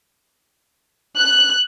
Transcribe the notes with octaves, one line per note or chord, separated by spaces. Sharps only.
F#6